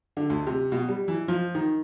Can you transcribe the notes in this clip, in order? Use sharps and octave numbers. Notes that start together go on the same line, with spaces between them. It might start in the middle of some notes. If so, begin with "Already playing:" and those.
D3
D2
C3
B2
G3
E3
F3
D#3